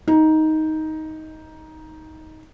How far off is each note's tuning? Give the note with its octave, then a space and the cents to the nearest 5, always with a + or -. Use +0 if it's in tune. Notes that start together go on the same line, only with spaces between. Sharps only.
D#4 +10